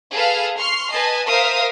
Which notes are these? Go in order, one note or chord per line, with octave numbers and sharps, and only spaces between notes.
G#4 A4 B4 F5 F6
C6 C#6 F6 C7
B4 D#5 G#5 A5
A#4 C5 E5 F5 D#6